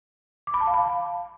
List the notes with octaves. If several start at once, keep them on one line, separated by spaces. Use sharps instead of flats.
D6
B5
A5
F5
B5